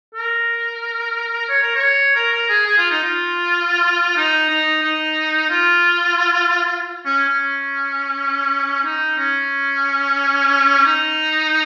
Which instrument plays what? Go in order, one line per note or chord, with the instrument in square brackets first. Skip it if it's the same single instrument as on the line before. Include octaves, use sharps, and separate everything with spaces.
[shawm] A#4
C#5
A#4
C#5
A#4
A#4
G#4
G#4
F4
D#4
F4
D#4
D#4
D#4
F4
C#4
C#4
D#4
C#4
D#4